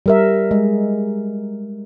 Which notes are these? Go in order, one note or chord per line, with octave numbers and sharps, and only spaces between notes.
G3 A#4 E5
G#3